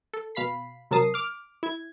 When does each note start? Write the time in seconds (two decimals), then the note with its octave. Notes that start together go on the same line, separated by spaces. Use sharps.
0.13 A4
0.35 B2 F5 B5 B6 C7
0.91 C3 F#3 A#4 A5 D#6 C7
1.14 D6 F6
1.63 E4 G#6